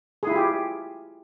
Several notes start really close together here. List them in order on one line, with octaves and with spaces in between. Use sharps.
G#4 E4 F4 G4